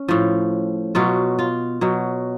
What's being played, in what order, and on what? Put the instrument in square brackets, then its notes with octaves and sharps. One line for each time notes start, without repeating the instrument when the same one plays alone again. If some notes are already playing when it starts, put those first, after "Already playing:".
Already playing: [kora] C#4
A2 F3
B2 F#3 F4
F4
B2 F#3